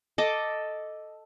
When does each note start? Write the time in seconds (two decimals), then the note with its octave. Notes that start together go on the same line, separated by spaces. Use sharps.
0.18 A4 D#5 A5 D6